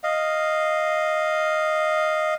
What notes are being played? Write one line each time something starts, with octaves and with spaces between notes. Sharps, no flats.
D#5 F5